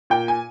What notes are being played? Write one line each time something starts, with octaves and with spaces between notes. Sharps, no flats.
A#2 G5
G#5